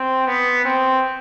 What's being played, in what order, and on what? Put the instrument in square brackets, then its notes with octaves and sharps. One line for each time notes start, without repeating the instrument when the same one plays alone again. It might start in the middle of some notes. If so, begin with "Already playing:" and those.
Already playing: [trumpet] C4
B3
C4